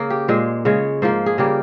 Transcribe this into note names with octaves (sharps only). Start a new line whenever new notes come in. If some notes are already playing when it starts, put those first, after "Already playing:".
Already playing: C#3 A#3
G4
A#2 G#3 C5
C#3 G#3 C#5
G#2 F3 A#3 C5
G#4
C#3 G3 A#3 G4